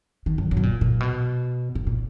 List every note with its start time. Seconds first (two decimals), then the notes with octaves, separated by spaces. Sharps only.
0.26 D#3
0.38 F#2
0.51 F#2
0.57 B2
0.63 A#2
0.81 A#2
1.00 B2
1.75 G#2
1.87 A#2